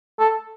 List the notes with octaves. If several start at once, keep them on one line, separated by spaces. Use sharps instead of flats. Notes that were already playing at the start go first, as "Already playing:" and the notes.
A4